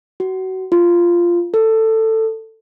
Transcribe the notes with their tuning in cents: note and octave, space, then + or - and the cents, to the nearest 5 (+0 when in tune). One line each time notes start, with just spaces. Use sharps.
F#4 +25
F4 -10
A4 +15